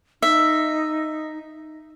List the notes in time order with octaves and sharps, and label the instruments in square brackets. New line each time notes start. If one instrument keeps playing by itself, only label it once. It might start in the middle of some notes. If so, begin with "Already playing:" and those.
[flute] D#4 [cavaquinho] E5